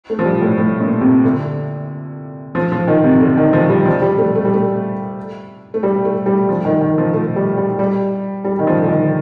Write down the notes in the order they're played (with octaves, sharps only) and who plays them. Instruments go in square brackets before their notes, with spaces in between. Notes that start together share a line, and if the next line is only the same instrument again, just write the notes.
[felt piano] A3
F3
G3
A2
A2
A#2
C3
D3
F3
F3
D#3
C3
D3
D#3
F3
G3
F3
G3
A3
A3
G3
A3
A3
G3
A3
G3
F3
D#3
D#3
F3
A3
G3
G3
G3
G3
D#3
F3
D3
D#3